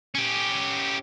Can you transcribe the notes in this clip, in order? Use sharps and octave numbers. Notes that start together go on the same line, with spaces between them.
C#4 G4